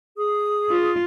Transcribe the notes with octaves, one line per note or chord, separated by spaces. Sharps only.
G#4 D#6
F4